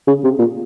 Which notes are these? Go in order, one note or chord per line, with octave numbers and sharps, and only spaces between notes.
C#3
C3
A#2